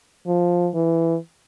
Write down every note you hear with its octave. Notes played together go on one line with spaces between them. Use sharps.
F3
E3